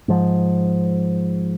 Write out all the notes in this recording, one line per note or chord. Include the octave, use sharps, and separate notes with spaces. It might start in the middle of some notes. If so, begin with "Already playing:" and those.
G#2 F3